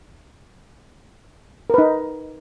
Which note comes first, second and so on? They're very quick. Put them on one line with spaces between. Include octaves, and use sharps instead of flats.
A#4 B4 D#4